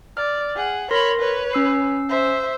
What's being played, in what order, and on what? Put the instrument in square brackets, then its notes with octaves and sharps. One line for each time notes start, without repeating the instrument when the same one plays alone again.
[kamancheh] D5 [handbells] F6
[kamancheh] G#4 F#5
[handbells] A#4 C6 A#6 [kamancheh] C#5 B5
[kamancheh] B4 C#5
[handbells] C#4 E6 C7
[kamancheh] C5 E5